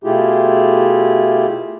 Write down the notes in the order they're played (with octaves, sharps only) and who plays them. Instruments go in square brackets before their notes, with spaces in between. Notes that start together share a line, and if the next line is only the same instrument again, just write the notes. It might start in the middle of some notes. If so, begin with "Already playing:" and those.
[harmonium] B2 A3 E4 F4 G4 G#4